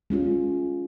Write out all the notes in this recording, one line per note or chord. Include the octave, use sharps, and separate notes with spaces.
G#3 C#4 F4 G4